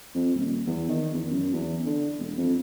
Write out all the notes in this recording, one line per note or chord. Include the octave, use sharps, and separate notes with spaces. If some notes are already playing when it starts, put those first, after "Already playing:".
F2
D#1
E2
D#3
E2
F#2
E2
D3
E1
F2